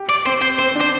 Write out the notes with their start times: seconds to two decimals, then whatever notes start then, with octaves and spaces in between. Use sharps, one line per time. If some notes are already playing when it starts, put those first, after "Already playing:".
Already playing: G4
0.09 D5
0.26 C4 C5
0.42 C5
0.59 C4 C5
0.75 D4
0.81 C5